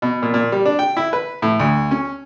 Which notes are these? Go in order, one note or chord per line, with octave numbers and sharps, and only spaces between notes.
B2
A#2
A#2
G3
D4
G5
E4
B4
A2
D2
C#4